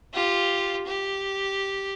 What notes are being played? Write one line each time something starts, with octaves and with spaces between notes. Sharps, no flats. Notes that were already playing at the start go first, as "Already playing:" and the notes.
F4 G4
G4